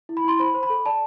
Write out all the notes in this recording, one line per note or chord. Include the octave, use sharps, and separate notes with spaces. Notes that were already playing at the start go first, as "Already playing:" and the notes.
E4
B5
E4 C6
C5 B5
C5
B5
A4
D5 A5